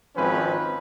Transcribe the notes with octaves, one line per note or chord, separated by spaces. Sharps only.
G#1 F3 G#3 C4 C#4 B4